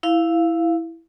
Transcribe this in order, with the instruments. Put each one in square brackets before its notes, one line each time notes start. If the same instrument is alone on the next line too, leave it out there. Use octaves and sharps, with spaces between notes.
[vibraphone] E4 F5